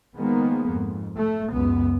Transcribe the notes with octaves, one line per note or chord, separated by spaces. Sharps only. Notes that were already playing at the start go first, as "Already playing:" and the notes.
D#3 F3 G#3 A#3 B3
F2 G#2
A3
C#2 F#2 B3